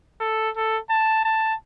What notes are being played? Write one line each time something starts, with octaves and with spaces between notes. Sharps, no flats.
A4
A4
A5
A5